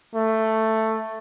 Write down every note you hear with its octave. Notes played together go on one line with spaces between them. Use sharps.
A3